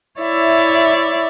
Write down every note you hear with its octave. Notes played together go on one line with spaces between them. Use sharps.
E4 C#5 D5 E5